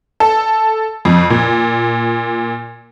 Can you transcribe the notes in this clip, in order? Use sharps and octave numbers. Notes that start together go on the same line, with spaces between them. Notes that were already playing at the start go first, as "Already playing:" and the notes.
A4
F2
A#2